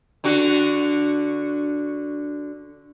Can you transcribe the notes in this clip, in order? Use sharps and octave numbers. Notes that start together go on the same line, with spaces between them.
D3 D4 F#4